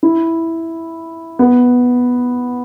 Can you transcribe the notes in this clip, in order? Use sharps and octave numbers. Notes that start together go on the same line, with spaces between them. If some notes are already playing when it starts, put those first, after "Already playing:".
E4
B3